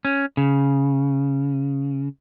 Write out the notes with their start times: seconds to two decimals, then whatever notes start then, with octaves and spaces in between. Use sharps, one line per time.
0.05 C#4
0.37 C#3